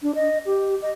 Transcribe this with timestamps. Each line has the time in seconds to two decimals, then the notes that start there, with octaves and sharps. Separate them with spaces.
0.03 D4
0.15 D#5
0.46 G4
0.82 D#5